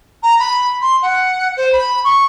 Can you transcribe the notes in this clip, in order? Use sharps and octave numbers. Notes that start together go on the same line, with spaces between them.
A#5
B5
C6
F#5
C5
B5
C#6